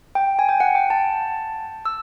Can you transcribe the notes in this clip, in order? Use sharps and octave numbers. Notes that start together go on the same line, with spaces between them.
G5
G#5
G5
F#5
G5
A5
E6